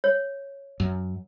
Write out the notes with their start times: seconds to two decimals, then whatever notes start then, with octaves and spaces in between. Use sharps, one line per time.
0.04 C#5
0.80 F#2